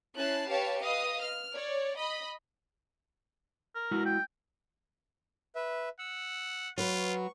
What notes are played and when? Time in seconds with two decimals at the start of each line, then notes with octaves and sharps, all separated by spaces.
0.15 C#4 E4 A5 F#6 C7
0.49 G4 B4 C#5 F5 A5 C#7
0.82 B4 D#5 F5 D#6
1.21 F6
1.54 C#5 D5
1.97 D#5 B5
3.75 A#4
3.91 G#3 E4 F#4
4.05 G5
5.55 B4 E5
5.99 F#5 E6
6.78 F#3 F4 B4 C#6